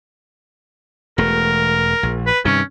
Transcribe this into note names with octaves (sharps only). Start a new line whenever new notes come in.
E1 A3 A#4
A#1
B4
G2 C3 D#3 C#4